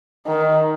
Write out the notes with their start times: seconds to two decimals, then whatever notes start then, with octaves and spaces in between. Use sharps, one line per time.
0.27 D#3